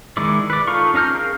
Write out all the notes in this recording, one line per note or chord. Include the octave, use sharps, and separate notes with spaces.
D#3 G#3 D#4 E4 D5
B4 D5
D#4 F4 A4 F5 C#6
C#4 D#4 A#5 F6 G6
G#4 A#4 F5